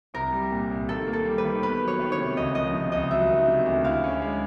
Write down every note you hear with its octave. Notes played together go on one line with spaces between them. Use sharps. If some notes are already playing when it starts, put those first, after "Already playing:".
C2 A#4
G3
A#2
C2
D#3 A4
A#3
A4
G3
B4
D#3
B3 B4
F#3
C#5
D#3
C#5
C3
C#2 D#5
F3 D#5
C3
C#2 D#5
F#3 E5
D#3
C3
D2
E4 F5
C#4
G#3